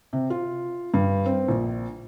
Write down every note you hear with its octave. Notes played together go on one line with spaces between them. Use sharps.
C3
F4
G2
C4
A#1